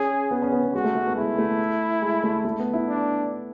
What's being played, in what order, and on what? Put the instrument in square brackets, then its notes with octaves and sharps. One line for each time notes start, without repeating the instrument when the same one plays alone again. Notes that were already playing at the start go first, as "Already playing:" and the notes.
Already playing: [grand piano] C#4 [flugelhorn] G#4
[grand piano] B3
C#4
B3
B3
[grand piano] G#3 [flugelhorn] F#4
[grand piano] A3
A3
B3
[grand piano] G#3 [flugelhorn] E4
[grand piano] A3
G#3
A3
A3
B3
E4
[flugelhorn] D4